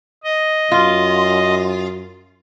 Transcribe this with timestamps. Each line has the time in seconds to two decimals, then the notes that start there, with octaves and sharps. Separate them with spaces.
0.24 D#5
0.72 F#2 F4